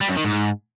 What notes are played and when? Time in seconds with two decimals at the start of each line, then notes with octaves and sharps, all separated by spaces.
0.01 G3
0.09 F#2
0.17 D#3
0.25 G#2